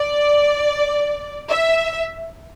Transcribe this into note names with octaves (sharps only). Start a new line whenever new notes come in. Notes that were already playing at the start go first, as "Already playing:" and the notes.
Already playing: D5
E5